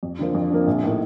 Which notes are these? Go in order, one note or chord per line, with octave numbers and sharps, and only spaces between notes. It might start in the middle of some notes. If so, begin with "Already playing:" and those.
F2
D3 F3 A#3
F2
D3 F3 A#3
A#1
A2 A3 D#4 A#4